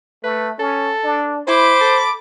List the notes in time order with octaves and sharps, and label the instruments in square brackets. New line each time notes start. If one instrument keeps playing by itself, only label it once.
[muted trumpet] A3 [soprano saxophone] B4
[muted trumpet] C#4 [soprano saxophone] A4
[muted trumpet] D4
[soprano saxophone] E4 [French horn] C5 [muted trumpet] B5 [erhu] D6
[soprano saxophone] A4